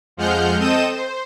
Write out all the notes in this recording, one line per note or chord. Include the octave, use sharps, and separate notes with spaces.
F2 F3 G#3 F#5 F6 G6
C4 A4 D#5 D#6 G6 E7
C5